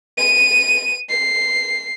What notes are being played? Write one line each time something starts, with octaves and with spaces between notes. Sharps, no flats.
D#7
C7